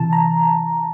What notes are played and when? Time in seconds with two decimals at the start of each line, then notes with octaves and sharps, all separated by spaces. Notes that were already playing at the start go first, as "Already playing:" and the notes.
Already playing: C3 E3 A5
0.13 A#5